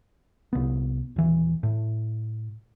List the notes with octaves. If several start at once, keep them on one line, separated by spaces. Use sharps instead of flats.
C2 B3
D#1 E3
A2